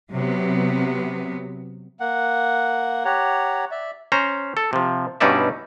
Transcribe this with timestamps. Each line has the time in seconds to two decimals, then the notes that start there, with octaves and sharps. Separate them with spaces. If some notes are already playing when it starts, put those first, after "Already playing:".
0.11 C3 F#3 B3
2.00 A#3 F#5
3.05 G4 C#5 F#5 A#5
3.71 D5 E5
4.12 C#4 C5 A#5
4.57 A4
4.73 C3 F3
5.20 G2 B2 C#4 D#4 D5 E5